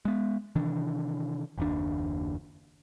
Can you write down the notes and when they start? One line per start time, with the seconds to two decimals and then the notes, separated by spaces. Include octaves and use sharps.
0.05 G#3 B3
0.55 C3 D#3 E3 D4
1.58 F#1 D#2 D4